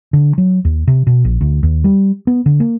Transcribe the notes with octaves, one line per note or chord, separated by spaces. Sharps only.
D3
F#3
D#2
C3
B2
A#1
D2
D#2
G3
B3
D3
A#3